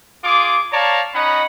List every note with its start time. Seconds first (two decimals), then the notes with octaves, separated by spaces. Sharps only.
0.24 F4 G#4 D6
0.73 C#5 D5 F5 A5 A#5
1.15 C#4 D#4 D#5 F#5 B5